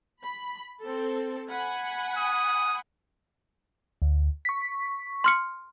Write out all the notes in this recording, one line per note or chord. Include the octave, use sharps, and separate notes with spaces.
B5
C4 A4
F#5 G#5 B5
D#6
D2
C#6 B6
C6 F6 C#7